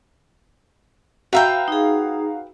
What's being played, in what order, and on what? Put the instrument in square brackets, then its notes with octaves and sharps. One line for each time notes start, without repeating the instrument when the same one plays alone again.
[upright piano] F#4 F5 A#5 [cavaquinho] B4 E5 G5
[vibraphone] D#4 G#4